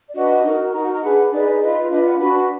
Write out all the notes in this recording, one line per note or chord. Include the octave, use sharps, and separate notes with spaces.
D5
D4 F#4 B4 D#5
D#4 F#4 A#4
D#4 F#4 A#4 A#5
F#5
A#5
D4 G#4 B4 F#5
D#4 G#4 B4 D5
F4 B4 D#5
D4 F4 B4 D#5
F#5
D4 F#4 B4 B5